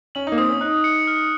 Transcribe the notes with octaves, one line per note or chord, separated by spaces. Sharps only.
C#4 F#7
D#4
A#3
C4 D#6
C#4
D#4 F#6
C#7
F6